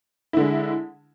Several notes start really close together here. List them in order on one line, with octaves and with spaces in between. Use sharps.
E4 D3 G#3